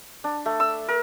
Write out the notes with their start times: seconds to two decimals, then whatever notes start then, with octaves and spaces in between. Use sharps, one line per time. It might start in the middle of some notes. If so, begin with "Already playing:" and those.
0.24 D4
0.46 A3
0.60 E6
0.88 A#4